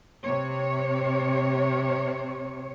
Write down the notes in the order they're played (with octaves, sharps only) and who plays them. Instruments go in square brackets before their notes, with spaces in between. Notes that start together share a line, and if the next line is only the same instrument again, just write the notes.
[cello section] C3 C#5